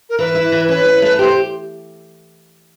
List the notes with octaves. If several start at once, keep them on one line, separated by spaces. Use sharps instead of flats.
A#4
E3 B4
E4
E3
C#4 B4
C#4
A3
G4 C5